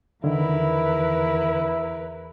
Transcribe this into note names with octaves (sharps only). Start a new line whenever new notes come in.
E2 D3 D#3 E4 A#4 B4